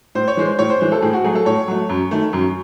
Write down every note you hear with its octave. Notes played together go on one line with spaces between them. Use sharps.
A2 C5
C#5
E3 G#3 C5
A2 C#5
C5
E3 G#3 C5
A4
A2 G#4
F#4
F#3 A3 G#4
A4
A2 C#5
F#3 A3
F#2
D#3 A3
F#2